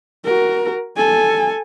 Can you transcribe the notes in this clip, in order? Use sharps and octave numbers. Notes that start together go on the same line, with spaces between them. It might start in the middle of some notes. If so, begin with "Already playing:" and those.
F#4 A#4
A4 G#5